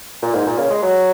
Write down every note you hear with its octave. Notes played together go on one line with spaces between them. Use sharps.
A#2
G#2
A#2
C#3
G#3
F#3